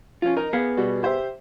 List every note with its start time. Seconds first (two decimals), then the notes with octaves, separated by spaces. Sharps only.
0.22 F3 C#4 F4
0.37 D#4 A#4
0.53 B3 G#4 F5
0.77 B2 G3 F#4
1.03 G4 C5 E5